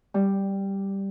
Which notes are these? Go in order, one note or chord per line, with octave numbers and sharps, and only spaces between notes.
G3